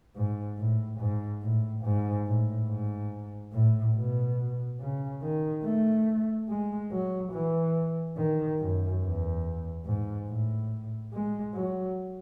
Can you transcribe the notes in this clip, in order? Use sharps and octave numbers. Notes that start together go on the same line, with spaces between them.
G#2
A2
G#2
A2
G#2
A2
G#2
A2
B2
C#3
D#3
A3
G#3
F#3
E3
D#3
F#2
E2
G#2
A2
G#3
F#3